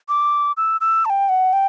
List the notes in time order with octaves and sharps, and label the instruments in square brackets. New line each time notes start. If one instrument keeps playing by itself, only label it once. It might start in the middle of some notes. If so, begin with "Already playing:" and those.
[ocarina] D6
E6
E6
A5
G5
F#5
G5